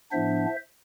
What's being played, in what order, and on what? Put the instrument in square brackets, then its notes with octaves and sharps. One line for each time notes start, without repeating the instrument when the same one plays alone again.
[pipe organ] A2 F3 B3 D4 C5 E5